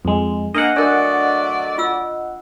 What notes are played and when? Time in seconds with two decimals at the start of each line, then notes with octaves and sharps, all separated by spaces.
0.05 F2 G#3
0.55 A#3 D4 D#5 F#5
0.76 F#3 A3 D4 A#4 D5
1.78 F4 E6